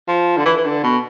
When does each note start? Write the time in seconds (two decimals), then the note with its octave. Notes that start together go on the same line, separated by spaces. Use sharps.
0.08 F3
0.37 D3
0.45 E3
0.58 E3
0.65 D3
0.84 B2